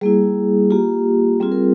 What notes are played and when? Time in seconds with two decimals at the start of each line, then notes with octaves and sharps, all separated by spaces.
0.01 G3 A#3 E4 G#4
0.71 A#3 F4 G4
1.40 G3 C4 F4 G#4
1.52 A#4